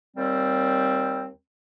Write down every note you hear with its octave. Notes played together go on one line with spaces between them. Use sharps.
D#2 G3 C4